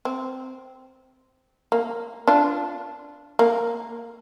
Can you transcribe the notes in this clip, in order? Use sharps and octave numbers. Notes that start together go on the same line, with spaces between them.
C4
A#3
D4 F4
A#3